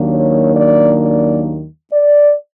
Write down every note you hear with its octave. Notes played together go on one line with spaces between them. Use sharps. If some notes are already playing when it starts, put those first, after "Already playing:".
Already playing: D#2 D#3 F#3 A#3 D4
C#5
D5
D5
D5